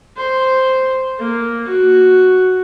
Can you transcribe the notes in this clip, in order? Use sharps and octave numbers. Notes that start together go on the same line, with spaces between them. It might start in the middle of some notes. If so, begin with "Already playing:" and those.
C5
A#3
F#4